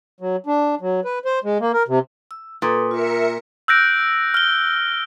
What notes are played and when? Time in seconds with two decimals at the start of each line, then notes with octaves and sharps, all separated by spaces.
0.20 F#3
0.46 D4
0.81 F#3
1.05 B4
1.25 C5
1.44 G#3
1.60 A#3
1.74 A#4
1.88 C3
2.31 E6
2.62 A#2 A4 B4 D#6
2.91 F4 A#4 E5 C#7
3.68 E6 F#6 G6 A#6 D7
4.34 F6 G7